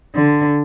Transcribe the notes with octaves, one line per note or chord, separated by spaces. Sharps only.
D3